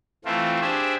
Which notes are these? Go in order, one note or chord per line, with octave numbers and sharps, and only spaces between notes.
E3 A3 C4 F4
D4 G4 G#4 C5 E5